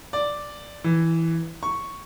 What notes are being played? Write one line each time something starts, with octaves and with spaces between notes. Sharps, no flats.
D5
E3
C#6